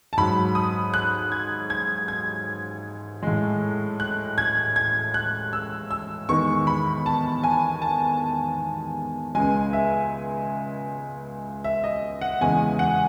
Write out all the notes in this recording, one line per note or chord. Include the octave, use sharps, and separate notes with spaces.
A5
G#2 F#3 B5
D#6
F#6
G#6
G#6
G#6
A2 G#3
F#6
G#6
G#6
F#6
E6
E6
E2 D#3 G#3 C#6
B5
A5
G#5
A5
C#2 C#3 G#3 G#5
E5
E5
D#5
F#5
E2 C#3 E3 G#3 G#5
F#5